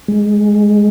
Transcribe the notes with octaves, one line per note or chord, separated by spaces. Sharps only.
G#3